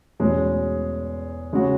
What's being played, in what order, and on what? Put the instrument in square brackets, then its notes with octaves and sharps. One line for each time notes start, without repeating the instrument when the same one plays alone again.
[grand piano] E2 B2 G#3 C#4
C#3 G#3 C#4 F#4